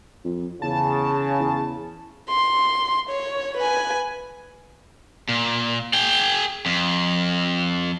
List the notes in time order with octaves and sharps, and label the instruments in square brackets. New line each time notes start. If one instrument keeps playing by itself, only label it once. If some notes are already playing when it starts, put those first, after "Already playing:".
[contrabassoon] F2
[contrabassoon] E2 [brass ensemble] C#3 [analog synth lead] A5
[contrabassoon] E2
[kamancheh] C6
C#5
B4 G#5
[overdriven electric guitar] A#2
G#4 G5
F2